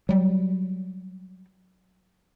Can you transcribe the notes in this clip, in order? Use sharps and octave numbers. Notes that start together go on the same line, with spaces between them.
F#3 G3